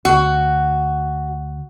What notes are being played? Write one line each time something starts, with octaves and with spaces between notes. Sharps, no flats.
D2 F#4